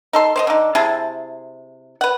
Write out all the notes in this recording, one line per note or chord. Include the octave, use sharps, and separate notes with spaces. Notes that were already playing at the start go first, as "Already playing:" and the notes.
D#4 A4 C6
C5 D5 D#5
D3 D#4
C3 E4 G#4 A5
B4 F#5